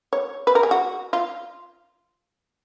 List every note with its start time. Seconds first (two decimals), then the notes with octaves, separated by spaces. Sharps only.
0.13 C#5
0.47 B4
0.55 A#4
0.63 G#4
0.71 F#4
1.13 F4